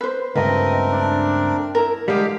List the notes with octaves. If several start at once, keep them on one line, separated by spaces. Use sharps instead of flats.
B4 C5
C#2 G2 A3 C4 A#4 B4 D#5
D4
E4 A#4
D3 G3 G#3 G4 F5